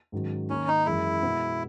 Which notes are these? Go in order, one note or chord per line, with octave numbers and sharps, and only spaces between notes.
G#2 D#3 F#3 C#4
D#3 A#3 C#4 D#4
D#4
F#2 E3 G#3 E4
B2 G#3 B3